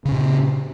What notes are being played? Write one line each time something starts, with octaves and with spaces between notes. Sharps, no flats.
A#2 C#3 C#4